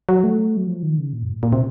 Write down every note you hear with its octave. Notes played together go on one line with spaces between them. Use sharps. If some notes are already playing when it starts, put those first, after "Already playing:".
F#3
A3
F#3
F3
D#3
C#3
A#2
F#2
A2
A#2
C3